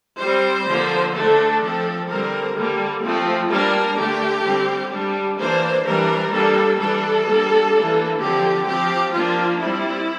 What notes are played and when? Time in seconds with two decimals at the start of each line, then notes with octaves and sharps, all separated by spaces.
0.20 G3 C4 C5
0.67 D3 F3 A#3
1.14 D3 A3 D4 A4
1.62 F3 C4 A4
2.09 D3 G3 C4 A#4
2.56 D3 G3 A#3
3.02 F3 A3 C4
3.50 G3 A#3 D4 A#4
3.97 D3 A3 D4 G4
4.44 D3 G3 C4
4.91 G3 D4
5.38 E3 A#3 D4 C5
5.85 E3 G3 D4 A#4
6.32 G3 A#3 D4 A4
6.78 E3 G3 D4 A4
7.26 G3 A#3 D4
7.73 E3 A#3 D4
8.20 D3 F3 C4 G4
8.67 F3 C4 G4
9.14 F3 A#3 D4 F4
9.61 G3 C4 E4